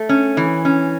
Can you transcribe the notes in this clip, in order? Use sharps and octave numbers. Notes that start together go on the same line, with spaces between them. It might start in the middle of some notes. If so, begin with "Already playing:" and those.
Already playing: A3
C#4
E3
C#4